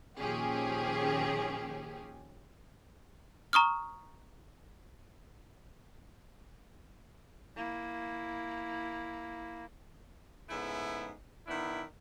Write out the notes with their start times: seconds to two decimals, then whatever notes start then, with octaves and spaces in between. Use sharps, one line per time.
0.20 A#2 D#3 F3 C#4 G4 G#4
3.53 A#5 C#6 D#6 F6
7.57 A#3 E4
10.49 G#2 C#3 A3 B3 E4
11.47 D#3 B3 D4 E4